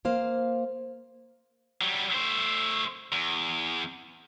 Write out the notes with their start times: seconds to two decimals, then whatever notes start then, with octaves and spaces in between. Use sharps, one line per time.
0.05 A#3 C5 F5
1.81 F#3 G3
2.14 A3 C5
3.12 E2